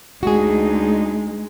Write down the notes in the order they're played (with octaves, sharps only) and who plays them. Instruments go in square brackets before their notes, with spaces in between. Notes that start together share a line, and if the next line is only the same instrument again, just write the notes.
[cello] D2 D#4 [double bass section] G#3 [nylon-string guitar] F#4 G#4